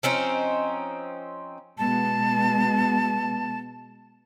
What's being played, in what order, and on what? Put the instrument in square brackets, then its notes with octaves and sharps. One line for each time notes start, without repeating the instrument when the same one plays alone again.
[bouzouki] F3 C4 C#4 D#4
[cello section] B2 G#3 B3 [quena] A5